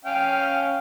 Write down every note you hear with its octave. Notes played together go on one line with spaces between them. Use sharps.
C#4 F5 G5